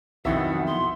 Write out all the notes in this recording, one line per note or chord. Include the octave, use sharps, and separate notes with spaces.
B1 F2 B2 D#3 E4 E5 F#5
C6